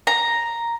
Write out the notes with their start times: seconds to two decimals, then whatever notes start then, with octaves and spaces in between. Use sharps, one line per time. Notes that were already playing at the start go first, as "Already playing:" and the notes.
0.07 A#5